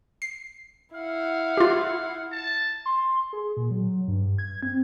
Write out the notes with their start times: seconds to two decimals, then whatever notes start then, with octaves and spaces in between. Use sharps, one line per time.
0.22 C7
0.95 E4 F5 F#5
1.57 F4 G4
2.32 A5
2.86 C6
3.33 G#4
3.57 A#2
3.71 F#3
4.08 G2
4.38 G#6
4.63 C4